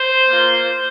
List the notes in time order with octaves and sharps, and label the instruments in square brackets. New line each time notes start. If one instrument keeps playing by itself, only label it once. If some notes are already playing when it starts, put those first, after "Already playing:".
Already playing: [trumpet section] C5
A#3 F4